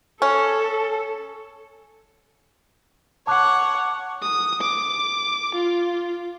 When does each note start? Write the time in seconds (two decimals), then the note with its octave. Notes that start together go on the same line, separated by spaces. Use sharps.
0.22 C#4 A4
3.27 C#5 F#5 A5 D6 F#6
4.22 D#6
4.61 D6
5.55 F4